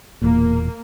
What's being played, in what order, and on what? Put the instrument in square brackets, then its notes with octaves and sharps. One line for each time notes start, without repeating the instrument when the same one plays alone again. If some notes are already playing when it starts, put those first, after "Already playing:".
[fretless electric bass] E1 E2 A#2 [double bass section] A#3